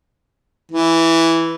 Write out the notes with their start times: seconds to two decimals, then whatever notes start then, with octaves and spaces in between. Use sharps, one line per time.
0.72 E3